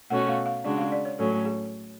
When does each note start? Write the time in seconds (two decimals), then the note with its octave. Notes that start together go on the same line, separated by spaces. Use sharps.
0.10 B2 A3 C#4 F#4 F#5
0.29 F5
0.46 F5
0.64 C#3 G#3 D4 F#4 D5
0.78 F5
0.92 D5
1.05 C#5
1.19 A2 F#3 C#4 A4
1.45 G#4